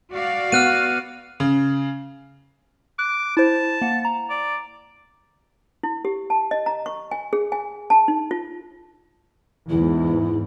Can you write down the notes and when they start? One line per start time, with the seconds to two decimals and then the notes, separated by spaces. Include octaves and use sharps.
0.13 F#4 D5 F5
0.52 B3 F6 F#6 D#7
1.40 C#3
2.99 D6 F#6
3.37 E4 C5 A5
3.81 A#3 F#5
4.05 A#5
4.29 D5
5.83 E4
6.05 G4
6.30 A5
6.51 D#5
6.66 A#5
6.86 C#6
7.11 G#5
7.33 G#4
7.52 G#5
7.90 A5
8.08 D#4
8.31 F4
9.70 E2 G#2 E4